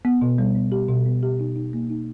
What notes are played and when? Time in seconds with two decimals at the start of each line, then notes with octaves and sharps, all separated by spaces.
0.05 B3
0.21 B2
0.38 G3
0.55 B3
0.72 G4
0.89 B2
1.06 B3
1.23 G4
1.40 D#4
1.56 D#4
1.73 A#3
1.90 D#4